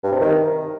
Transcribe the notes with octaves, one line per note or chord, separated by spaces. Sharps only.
G2
C3
D#3